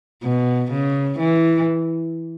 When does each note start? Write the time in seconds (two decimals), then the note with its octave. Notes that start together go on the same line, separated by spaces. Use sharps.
0.23 B2
0.71 C#3
1.18 E3